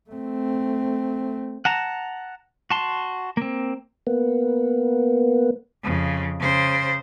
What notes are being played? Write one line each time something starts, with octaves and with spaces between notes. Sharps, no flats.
A3 C4
F#5 A5 A#5
F#4 A5 C6
A#3 C4
A#3 B3
F2 C#3
C#3 C5